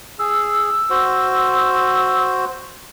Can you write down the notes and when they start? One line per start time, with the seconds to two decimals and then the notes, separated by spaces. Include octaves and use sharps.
0.19 G#4 E6
0.90 F#4 C5